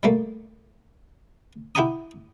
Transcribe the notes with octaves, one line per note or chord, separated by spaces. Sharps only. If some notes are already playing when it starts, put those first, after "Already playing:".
G3 A3 A#3
E4 G4 F#5 G#5 A#5 D#6